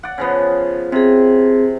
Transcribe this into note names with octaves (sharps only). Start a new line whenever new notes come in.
D5 F#5
C#3 F3 B3
C3 C4 G#4